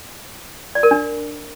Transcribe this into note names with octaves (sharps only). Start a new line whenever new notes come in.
D5
A#4
D4